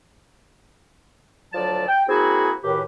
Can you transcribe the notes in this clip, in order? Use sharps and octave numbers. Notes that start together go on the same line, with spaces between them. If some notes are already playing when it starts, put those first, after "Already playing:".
D2 F3 F#3 D5 A5
G5
A#3 C4 E4 F#4 G#4
C#2 F#2 A2 D#3 G4 B4